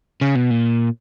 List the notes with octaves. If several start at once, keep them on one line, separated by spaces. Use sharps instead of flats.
C#3
B2
A#2